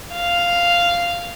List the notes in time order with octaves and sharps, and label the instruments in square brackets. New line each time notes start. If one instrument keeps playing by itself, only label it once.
[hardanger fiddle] F5